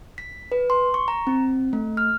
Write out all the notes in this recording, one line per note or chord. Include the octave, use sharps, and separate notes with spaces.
B6
B4
C6
C#6
A#5
C4
A3
F6